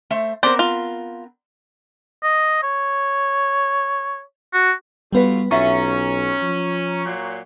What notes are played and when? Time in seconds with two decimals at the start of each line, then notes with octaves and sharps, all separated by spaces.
0.10 A3 C5 E5
0.43 B3 C4 A#4 C5 D5
0.59 F4
2.23 D#5
2.63 C#5
4.54 F#4
5.13 A2 G3 B3 F4 F#4 B4
5.51 B1 C#4 F4 E5 F#5 A#5 C#6
6.42 F3
7.05 A#2 F#3